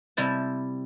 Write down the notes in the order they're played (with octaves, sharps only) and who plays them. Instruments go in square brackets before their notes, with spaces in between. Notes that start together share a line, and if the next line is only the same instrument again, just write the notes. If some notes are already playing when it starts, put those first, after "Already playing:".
[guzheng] C3 G3 E4 A5